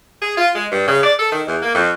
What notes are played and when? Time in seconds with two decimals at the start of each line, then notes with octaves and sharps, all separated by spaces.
0.22 G#4
0.38 F4
0.56 G#3
0.72 G2
0.88 C#3
1.04 D5
1.19 A4
1.32 D#3
1.48 E2
1.63 A#3
1.75 F2